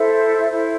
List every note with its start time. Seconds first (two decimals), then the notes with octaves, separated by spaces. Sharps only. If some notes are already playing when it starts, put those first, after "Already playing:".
Already playing: E4 A4 C5 E5
0.49 E4 A4 C5 E5